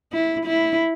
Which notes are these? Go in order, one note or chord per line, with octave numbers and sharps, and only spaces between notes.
E4
E4